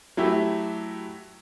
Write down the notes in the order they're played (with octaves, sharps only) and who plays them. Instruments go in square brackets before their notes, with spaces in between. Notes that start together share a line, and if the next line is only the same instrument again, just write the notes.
[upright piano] F#3 A3 E4 G4